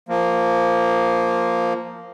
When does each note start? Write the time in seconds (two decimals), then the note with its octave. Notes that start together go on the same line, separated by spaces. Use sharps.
0.09 F3 A#3